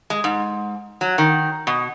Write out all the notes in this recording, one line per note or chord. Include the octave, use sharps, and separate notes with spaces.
G#3
G#2
F#3
D#3
B2